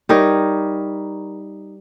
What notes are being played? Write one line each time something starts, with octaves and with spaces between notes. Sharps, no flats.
G3 D#4 A#4 C#5